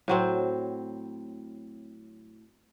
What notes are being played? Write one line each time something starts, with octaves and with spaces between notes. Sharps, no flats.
A2 F#3 C4